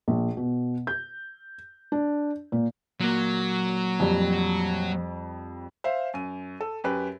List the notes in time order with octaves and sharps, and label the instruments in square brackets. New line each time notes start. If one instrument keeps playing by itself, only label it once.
[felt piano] A#1
B2
G6
D4
A#2
[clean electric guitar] A#2 A#3 [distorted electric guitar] F#3
[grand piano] F2 G3
[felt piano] C5 E5 F5
F#2 D#7
A4
F#2 G4 B4